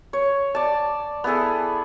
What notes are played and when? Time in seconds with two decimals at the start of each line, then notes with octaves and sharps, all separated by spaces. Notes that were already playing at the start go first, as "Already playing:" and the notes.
0.13 C#5
0.55 D5 A5
1.24 B3 E4 G#4 A4